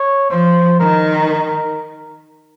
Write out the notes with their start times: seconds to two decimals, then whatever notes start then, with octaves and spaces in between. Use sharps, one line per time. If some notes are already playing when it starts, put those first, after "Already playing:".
Already playing: C#5
0.30 F3 C5
0.80 D#3 A#4
1.29 A#4